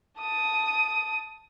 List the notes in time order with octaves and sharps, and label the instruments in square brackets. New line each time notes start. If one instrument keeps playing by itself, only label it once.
[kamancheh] A5 D#6